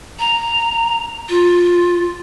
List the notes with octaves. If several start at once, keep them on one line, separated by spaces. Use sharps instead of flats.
A#5
F4